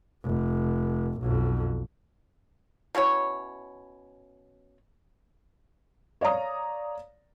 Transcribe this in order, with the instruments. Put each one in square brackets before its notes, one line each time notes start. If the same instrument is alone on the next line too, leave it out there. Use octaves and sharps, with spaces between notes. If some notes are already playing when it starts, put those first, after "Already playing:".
[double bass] F1
B1 F2
[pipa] B2 C#4 E4 C#5
[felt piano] C#5 D5 F5 A#5 D#6